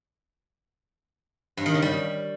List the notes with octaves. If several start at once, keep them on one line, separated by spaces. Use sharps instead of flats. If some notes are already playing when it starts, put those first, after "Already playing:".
G2
D#3
C#3
G3